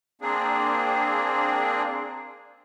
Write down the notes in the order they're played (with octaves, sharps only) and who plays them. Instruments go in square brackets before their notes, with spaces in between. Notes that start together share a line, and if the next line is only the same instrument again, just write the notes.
[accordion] A#3 C4 D4 G#4